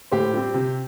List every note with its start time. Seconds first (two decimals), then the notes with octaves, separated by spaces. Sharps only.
0.11 A2 G4 C5
0.34 G3 C4
0.54 C3